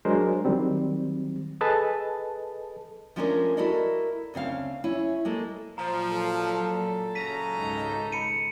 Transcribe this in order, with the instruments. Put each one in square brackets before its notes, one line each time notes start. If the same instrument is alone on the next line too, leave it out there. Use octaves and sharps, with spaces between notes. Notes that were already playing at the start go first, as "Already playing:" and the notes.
[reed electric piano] F#3 G#3 D4 F#4 A#4 C5
D#3 F#3 G3 C4
G#4 A4 B4 D#5 A5
[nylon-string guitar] F3 G#3 A3 C#4 D4 A#4
E4 F#4 A4 A#4 D5 D#5
D2 C#3 C4 F5
C#4 E4
G#3 A#3 A4
[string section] A#2 F#3 [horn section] F3 [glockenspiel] A#5
[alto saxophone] A4
[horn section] F#2 C#3 A#5 [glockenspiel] B6 D#7
[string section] G#1 C#2 D#4
[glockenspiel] B5 C#7 D#7